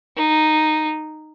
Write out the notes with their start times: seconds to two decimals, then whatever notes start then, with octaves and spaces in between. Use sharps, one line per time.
0.16 D#4